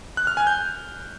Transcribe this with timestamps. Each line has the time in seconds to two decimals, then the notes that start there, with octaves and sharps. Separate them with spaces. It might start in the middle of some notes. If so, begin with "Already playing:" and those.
0.17 F#6
0.27 F6
0.37 G#5
0.47 G6